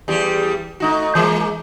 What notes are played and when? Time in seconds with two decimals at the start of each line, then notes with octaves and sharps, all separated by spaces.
0.08 E2 G3 G4
0.80 A3 D#4 F#4
1.15 E3 G#3 A#3